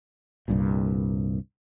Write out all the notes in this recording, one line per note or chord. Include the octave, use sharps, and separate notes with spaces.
C2 G2 A#2